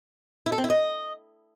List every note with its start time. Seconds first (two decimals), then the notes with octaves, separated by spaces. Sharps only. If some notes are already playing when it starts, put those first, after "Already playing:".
0.46 E4
0.52 A4
0.58 C4
0.64 E4
0.70 D#5